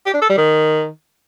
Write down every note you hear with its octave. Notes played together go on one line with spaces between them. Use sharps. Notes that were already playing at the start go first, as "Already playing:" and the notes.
G4
D4
A4
G3
D#3